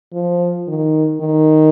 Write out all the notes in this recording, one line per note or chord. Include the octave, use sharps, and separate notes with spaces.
F3
D#3
D#3